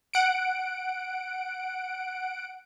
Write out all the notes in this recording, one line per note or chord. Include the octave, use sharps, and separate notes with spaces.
F#5 D7